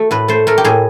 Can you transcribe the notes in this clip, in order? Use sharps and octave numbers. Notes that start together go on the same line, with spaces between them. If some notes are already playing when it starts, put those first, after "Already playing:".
Already playing: A3 F#4
A2 B4
A3 C5
A3 A#4
G4
A2 G#4